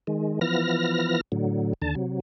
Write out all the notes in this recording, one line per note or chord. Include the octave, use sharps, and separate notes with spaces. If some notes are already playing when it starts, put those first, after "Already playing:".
D#3 G#3
E3 F3 B3 F6 A#6
A2 D3 F#3
D#2 D3 A5
C3 F#3